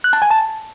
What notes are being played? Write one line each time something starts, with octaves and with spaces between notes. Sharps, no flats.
F#6
A5
G#5
A5